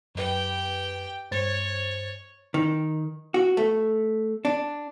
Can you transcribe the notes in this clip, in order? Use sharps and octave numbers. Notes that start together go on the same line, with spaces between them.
F#2 G4 B4 G5
G2 C5 C#5 A6
D#3
F#4
A3
D4